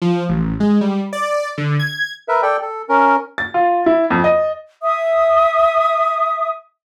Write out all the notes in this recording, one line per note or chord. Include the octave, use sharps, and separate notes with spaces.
F3
A1
G#3
G3
D5
D3
G#6
A#4 B4 E5
A4 D5 G5
A4
C#4 A#4
A6
F4
E4
F2
D#5
E5 D#6